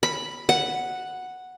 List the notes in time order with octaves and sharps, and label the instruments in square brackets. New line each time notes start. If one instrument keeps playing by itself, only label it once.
[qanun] B5
F#5